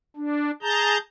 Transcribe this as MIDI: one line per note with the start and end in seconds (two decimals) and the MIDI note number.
0.17 0.51 62
0.62 0.98 68
0.62 0.98 81
0.62 0.98 82
0.62 0.98 91